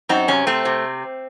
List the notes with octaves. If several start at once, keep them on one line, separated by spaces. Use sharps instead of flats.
F#2 C4 D#4
C3 C#4
A3 C4
C3